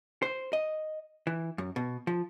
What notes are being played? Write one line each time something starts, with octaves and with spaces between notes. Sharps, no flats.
C5
D#5
E3
F#2
B2
F3